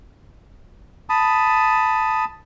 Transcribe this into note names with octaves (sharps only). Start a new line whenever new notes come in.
A5 B5 D#6